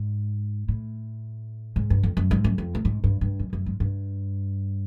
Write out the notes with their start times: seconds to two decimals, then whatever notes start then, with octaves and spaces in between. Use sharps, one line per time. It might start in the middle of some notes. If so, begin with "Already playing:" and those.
Already playing: G#2
0.68 A2
1.76 G#2
1.90 G2
2.03 F2
2.17 F#2
2.31 G#2
2.44 F#2
2.58 F2
2.75 A2
2.85 G#2
3.04 G2
3.21 G2
3.39 F#2
3.53 F#2
3.66 G#2
3.80 G2